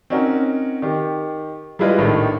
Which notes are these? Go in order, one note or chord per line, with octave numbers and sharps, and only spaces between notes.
C4 C#4 D#4 F#4 A#4
D#3 G4
G3 G#3 E4 F4 B4 D#5
A#1 A2 D#3